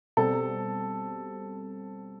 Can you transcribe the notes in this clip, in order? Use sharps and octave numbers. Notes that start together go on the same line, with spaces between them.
B2 G3 C4 A4